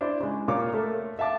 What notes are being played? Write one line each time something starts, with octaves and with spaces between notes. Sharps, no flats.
D4 E4 C5
C#3 G#3
A#2 A#3 F4 C#5 D6
A3 A4 A#4
E5 F5 A5 D6